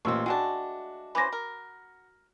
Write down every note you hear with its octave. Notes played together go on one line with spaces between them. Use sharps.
A1 A#2 F3 C4 C#6 E6
G#3 A3 D4 F#4 G5 A5
E3 C#4 C5 B5 D6 A#6
A#4